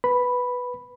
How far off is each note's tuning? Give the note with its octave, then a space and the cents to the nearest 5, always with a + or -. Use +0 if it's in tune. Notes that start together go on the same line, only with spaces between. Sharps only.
B4 +0 B5 +0